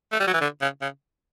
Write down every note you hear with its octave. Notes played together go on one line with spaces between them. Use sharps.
A3
G3
F#3
E3
D3
C#3
C#3